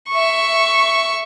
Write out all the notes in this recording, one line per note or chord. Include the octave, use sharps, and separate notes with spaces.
E5 C#6